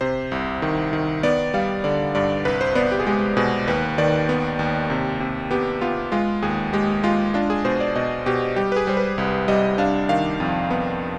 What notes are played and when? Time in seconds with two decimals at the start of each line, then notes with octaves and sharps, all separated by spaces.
0.01 C3 C5
0.32 C2
0.62 D#3
0.93 D#3
1.23 B3 D5
1.54 G3 F5
1.84 D3 D5
2.15 G2 D5
2.45 C2 B4
2.61 C5
2.75 B3 D5
2.92 G4
3.00 G#4
3.06 G#3 G4
3.37 B2 G#4
3.68 D#2 B4
3.98 D#3 D5
4.29 B3
4.59 D#2
4.90 C3
5.20 C3
5.51 B3 G4
5.81 B3 F4
6.12 G#3 F4
6.42 D#2 G#4
6.73 G#3 G4
7.04 G#3 F4
7.34 D4 F4
7.50 G#4
7.65 B2 C5
7.80 D5
7.95 B2 D#5
8.26 B2 G4
8.56 G3 G4
8.72 B4
8.76 G#4
8.87 G3 C5
8.97 B4
9.18 C2
9.48 G3 D#5
9.78 D4 F5
10.09 D#3 F5
10.40 F2
10.70 B3